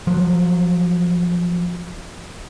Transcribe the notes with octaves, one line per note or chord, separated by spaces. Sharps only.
F3 F#3